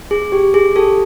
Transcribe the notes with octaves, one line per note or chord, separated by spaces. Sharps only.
G#4
G4
G#4
G4 A4